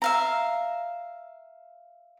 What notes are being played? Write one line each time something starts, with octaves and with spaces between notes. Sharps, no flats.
E5 F5 A#5